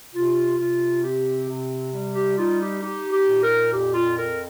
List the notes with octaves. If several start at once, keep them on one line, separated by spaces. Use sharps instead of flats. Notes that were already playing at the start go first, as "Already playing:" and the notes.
C3 F4
C3 F4
C4 G4
C3
G3
G4
D#4 F4
G4
D#4 G4
G4
A#2
A#4
F2 G4
F4
C4 A#4